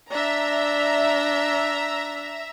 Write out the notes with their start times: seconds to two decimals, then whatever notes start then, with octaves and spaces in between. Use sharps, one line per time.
0.10 D4 E5 A#5